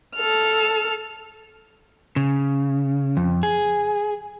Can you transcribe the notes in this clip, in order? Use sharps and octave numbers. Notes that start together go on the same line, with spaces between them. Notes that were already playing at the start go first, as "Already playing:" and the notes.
A4 F6
C#3
F2
G#4